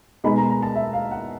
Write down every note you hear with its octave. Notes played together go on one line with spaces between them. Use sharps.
B2 G#3 B3 D#4 B5
A#5
A#5
A5
E5
F5
F#5